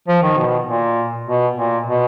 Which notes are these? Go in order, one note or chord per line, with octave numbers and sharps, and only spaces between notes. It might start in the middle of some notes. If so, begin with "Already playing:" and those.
F3
D#3
B2
A#2
B2
A#2
B2